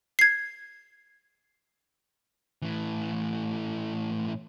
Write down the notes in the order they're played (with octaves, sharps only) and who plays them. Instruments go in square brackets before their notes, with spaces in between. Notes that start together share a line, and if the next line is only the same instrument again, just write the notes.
[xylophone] G#6 C7
[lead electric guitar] A2 E3